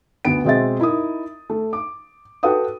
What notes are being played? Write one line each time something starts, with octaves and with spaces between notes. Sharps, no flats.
D2 B3 D7
B2 G#3 C4 D#5 E5 A6
D#4 E4 A#4 D#6
A3
D6
F#4 A4 B4 F#5 G5 D#6